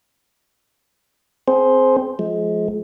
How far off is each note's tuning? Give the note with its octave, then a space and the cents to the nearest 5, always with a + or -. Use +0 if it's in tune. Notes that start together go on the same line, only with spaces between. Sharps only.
C4 +0 G#4 +25 C5 +0
F3 +0 G#3 +30